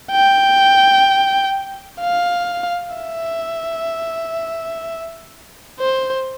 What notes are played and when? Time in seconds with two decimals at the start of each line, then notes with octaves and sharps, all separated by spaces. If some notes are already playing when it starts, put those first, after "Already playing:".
0.12 G5
2.01 F5
2.96 E5
5.80 C5